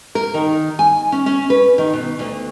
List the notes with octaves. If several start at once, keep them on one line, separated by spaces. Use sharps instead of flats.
A#4
D#3
G#5
C#4
C#4
B4
D#3
B2
D2